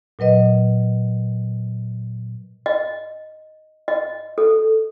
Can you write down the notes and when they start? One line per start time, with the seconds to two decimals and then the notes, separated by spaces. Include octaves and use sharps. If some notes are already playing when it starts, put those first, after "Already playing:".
0.19 A#2 F#3 B4 D#5
2.66 D#5
3.88 D#5
4.38 A4